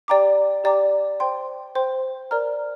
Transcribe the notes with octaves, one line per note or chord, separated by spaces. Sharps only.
G4 D5 G5 A#5 D6
G4 D5 G5 A#5 D6
C5 G5 C6
C5 G5 C6
A#4 D5 A#5 F6